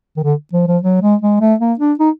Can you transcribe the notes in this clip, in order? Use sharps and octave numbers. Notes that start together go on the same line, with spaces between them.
D#3
D3
F3
F3
F#3
G#3
G#3
A3
A#3
D4
D#4